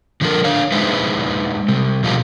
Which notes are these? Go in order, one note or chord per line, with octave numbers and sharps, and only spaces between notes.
D3 F3 C#4 F4 A4 A#4
D4 C#5 F5
G#3 D#4 E4 B4 C5
C3 G3
B2 F3 C#4 F4 G4 A#4